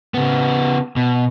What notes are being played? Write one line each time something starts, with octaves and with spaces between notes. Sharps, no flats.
C#3 B3
B2